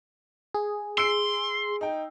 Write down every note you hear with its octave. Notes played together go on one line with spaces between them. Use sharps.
G#4
C6 E6 C7 D7
D#4 G5